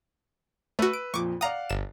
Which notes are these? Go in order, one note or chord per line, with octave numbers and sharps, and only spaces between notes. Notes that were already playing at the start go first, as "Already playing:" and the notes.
A3 F#4 B4 E6
D7
F2 A#2 F3 C#6 D6
D5 F5 F#5 A#5 D#6
G1 E7